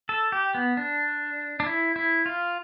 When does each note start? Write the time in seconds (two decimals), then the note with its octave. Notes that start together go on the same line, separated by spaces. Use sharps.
0.09 A4
0.32 G4
0.55 B3
0.77 D4
1.60 D4
1.67 E4
1.96 E4
2.26 F4